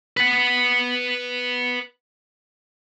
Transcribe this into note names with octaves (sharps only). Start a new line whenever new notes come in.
B4 F#5